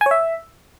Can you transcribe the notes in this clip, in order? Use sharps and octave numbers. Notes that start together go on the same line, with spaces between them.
G#5
C#5
E5